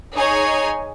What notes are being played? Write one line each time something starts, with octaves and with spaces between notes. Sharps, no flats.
D#4 G#4 C#5 G#5